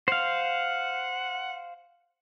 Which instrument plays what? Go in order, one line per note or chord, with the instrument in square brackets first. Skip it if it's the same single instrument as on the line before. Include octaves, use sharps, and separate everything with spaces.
[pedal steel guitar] C5 F5 [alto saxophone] F#5